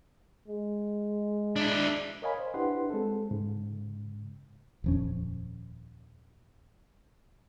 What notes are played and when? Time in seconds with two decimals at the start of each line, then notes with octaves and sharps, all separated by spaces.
0.48 G#3
1.56 D4 E4
2.22 A#4 C#5 D#5 F5 G#5 B5
2.38 C5
2.54 D4 E4 G4 B4 F#5 C6
2.90 G#3 C4 A4
3.31 G#2 C#3
4.84 D#1 F2 C#4